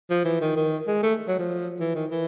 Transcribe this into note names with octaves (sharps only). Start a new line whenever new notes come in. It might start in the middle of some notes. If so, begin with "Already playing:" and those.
F3
E3
D#3
D#3
G#3
A3
F#3
F3
E3
D#3
E3